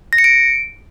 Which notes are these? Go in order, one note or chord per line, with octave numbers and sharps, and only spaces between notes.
A#6
C#7
D7